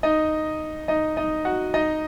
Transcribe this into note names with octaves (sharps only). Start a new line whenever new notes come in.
D#4 D#5
D#4 D#5
D#4 D#5
F#4 F#5
D#4 D#5